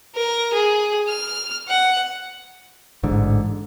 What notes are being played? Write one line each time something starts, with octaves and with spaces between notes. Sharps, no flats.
A#4
G#4
F6
F#5
A1 G#2 D3